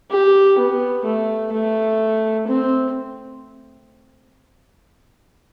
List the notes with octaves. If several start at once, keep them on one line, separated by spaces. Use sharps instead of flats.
G4
B3
A3
A3
C4